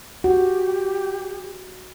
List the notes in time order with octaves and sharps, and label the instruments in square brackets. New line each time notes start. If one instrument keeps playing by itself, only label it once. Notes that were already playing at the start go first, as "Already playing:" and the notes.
[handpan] F#4 [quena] G4